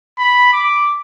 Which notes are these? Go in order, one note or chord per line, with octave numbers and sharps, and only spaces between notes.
B5
D6